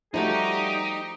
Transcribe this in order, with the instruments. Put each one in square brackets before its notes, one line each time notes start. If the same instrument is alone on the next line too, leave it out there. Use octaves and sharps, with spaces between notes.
[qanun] F3 A3 F#4 [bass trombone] G3 [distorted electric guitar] D#4 [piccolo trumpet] G4